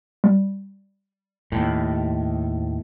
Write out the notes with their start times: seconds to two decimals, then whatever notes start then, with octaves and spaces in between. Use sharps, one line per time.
0.24 G3
1.52 D#2 A2